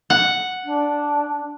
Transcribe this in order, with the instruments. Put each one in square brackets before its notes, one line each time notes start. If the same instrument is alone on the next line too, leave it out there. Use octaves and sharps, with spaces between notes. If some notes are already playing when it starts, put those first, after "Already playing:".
[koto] F#5
[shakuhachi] D4